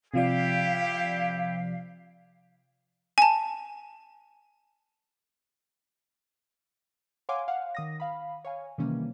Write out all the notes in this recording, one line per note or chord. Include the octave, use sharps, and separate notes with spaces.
C3 F3 E4 G4 D5 F5
G#5 A5
C#5 F5 F#5 G#5 C6 D6
F5 F#5
D#3 D#6 A#6
F5 B5
C#5 F5 G#5
C3 D#3 E3 G3 A#3 C#4